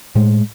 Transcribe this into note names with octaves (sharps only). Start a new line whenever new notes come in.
A2 G#3